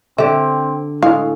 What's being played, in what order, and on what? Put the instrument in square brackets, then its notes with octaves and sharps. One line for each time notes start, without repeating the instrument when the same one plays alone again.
[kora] D3 G4 [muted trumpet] C4 [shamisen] E5
[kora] A2 [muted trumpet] G#3 [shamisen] F5